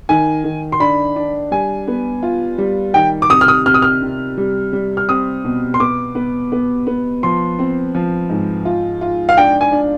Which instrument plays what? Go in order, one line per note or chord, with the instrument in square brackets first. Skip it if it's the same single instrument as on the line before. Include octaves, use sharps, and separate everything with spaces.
[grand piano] D#3 [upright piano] G#5
[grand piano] D#3
[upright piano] C6
[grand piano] D4 [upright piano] B5
[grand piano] D4
[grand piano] G3 [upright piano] G#5
[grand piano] B3
F4
G3
[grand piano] D#3 [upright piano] G5
[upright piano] D6
[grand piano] C3 [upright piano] D#6
[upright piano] F6
D#6
[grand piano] C3 [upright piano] F6
[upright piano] D#6
F6
[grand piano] C3
G3
G3
[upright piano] F6
[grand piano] C4 [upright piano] D#6
[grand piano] B2
[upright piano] C6
[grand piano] B3 [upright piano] D6
[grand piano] B3
B3
B3
[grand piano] F3 [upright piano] C6
[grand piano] C4
F3
G#2
F4
F4
[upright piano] F5
[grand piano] D4 [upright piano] G5
[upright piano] G#5
[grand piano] D4